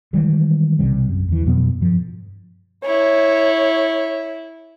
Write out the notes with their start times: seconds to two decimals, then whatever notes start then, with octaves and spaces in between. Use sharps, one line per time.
0.13 D#3 E3 G3 G#3
0.79 B1 C3 G3
1.09 F#2
1.28 E2 E3
1.46 F2 B2 F#3 B3
1.81 G2 F3
2.85 E4 C#5